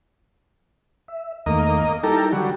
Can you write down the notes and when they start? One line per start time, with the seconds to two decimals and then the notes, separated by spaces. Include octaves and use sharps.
1.08 E5
1.46 E2 D#3 A3 A#3 D#5
2.03 G3 D#4 E4 G4 A4 A#4
2.32 D3 F#3 G3